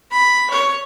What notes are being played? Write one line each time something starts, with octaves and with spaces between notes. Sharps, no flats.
B5
C#5